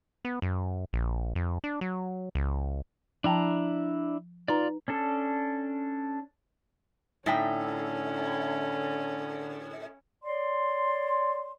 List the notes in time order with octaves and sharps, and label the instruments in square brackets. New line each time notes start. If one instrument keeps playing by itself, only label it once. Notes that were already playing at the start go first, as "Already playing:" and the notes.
[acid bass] B3
F#2
A#1
F2
D4
F#3
C#2
[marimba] F3 G5 A5 [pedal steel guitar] D4 E4 A#5
[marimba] D#4 B4 A#5 [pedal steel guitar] F4 D5
[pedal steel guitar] C#4 D4 A4
[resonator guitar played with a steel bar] A2 [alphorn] D3 [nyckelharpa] C#4 [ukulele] D#4 E5 G5
[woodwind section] C#5 D5 C6